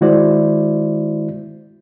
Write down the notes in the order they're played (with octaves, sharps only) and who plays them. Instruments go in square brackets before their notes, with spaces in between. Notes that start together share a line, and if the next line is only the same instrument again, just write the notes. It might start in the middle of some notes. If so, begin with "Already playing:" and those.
[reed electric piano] D#3 G#3 E4 F#4 C5 D5